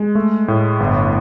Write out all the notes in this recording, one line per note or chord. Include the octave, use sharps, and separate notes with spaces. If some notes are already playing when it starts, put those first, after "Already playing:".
Already playing: G#3
A3
A2
G1